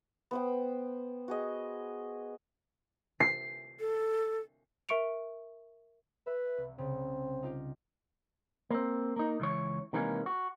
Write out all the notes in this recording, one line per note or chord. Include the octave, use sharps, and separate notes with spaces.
B3 C5 G5
F#4 G#4 D#5
C7
A4
A#4 E5 C#6 C#7 D7 F7
B4 E5
C2
C2 C#3 C4
D#4 F4 G4
A#3 C4
A#3 D#4
C#2 E3 C#5
C3 D#3 E3 G#3 A#3 C#4
F#4